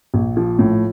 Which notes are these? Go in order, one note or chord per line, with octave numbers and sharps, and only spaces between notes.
A#1
F3
A2